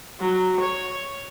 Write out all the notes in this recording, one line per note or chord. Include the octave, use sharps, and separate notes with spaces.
F#3
C#5